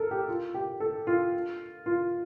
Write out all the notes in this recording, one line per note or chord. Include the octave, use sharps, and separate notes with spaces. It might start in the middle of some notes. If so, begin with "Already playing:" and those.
Already playing: A4 A#4
G4
F4
G4
A4
F4
F4